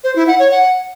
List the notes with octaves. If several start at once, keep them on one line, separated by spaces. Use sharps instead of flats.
C5
E4
F#5
C#5
F#5